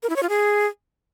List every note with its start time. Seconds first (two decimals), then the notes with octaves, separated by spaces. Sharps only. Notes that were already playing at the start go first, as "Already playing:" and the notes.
0.03 A#4
0.10 E4
0.16 C#5
0.23 F4
0.29 G#4